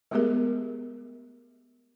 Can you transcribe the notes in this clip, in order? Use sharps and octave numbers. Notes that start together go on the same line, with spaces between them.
G#3 A3 B3 G4 G#4 A#4